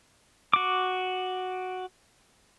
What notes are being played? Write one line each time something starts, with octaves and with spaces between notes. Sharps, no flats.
F#4 D6